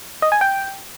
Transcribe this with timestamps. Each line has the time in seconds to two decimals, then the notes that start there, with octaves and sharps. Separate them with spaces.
0.22 D#5
0.32 G#5
0.41 G5